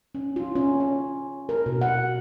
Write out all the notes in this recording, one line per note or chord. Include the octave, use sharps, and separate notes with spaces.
C#4
F4
C#4
C#4
A#4
B2
F#5